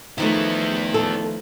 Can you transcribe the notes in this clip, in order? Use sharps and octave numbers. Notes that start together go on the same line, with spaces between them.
D#3 F3 A3 B3 E4
A4